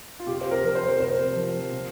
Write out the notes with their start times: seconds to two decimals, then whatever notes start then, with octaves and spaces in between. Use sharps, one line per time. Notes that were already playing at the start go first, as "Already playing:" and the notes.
0.20 F4
0.27 C3 G4
0.41 C5
0.51 A#4
0.64 F3 A#4
0.75 C5
0.96 A#4
0.99 C3 C5
1.36 F3
1.72 C3